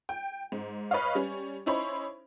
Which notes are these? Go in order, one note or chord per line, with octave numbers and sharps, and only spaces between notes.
G5
G#2
B4 C#5 D#5 F5
G3 C#4
C#4 D#4 E4 C5 C#5 B5